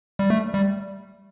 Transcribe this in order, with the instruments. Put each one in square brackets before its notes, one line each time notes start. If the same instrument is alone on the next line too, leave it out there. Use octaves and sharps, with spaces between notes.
[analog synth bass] G3
A3
G3